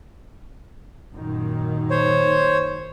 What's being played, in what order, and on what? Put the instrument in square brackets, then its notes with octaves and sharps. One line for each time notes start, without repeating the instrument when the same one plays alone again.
[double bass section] F#2 A#2 D#3
[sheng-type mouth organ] C5 C#5